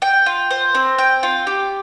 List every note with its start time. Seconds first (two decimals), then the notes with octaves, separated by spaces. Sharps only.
0.02 G5
0.26 F4
0.51 C5
0.75 C4
0.98 G5
1.23 F4
1.47 G4